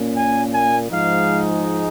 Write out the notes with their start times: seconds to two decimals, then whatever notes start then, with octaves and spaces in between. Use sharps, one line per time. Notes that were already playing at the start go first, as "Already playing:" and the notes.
Already playing: A#2 A#3 C#4
0.17 G#5
0.53 G#5
0.90 G#2 F3 G#3 D#4 F5